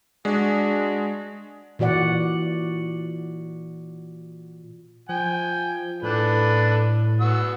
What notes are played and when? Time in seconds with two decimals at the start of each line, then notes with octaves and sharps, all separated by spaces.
0.25 G#3 D4 F#4
1.79 A#2 E3 F#4 D5 F#5
5.09 F3 G5 G#5
6.02 A2 D4 A4 B4
7.20 B3 F#4 E6